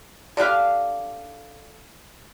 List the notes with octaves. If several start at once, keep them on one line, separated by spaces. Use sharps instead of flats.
D3 D4 G4 F5